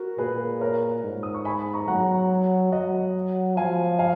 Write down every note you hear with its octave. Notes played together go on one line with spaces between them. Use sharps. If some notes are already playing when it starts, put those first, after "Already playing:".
Already playing: F#4 A#4
A#2 G#4 B4
A#4 C#5
G#2
D#6
C#6
G#5 B5
A#5 C#6
F#3 F#5 A#5
F#3 D#5 F#5
F3 F5 G#5
F5 G#5